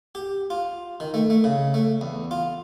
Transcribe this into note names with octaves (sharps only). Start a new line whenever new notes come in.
G4
F4
D#3
A3
A3
C#3
A3
E2
F4